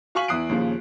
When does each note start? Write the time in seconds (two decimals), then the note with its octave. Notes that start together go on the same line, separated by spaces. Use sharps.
0.15 F#4 F5 G#5 C#6 B6 F#7
0.28 E2 E4 D#6 F#6 C7 D7
0.49 D#2 A#2 C#3 F3